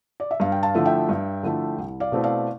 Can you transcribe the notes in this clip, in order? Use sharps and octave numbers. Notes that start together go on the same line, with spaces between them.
D5
E5
G2 F5
G5
F5 A5
D3 F3 A3 E4
E5 G5
G2
D3 F3 A3 E4
C2
D5 F5
B2 A3 C4 E4
D5 F5